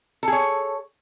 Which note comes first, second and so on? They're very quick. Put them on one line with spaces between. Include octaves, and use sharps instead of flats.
A4 G#4 C#5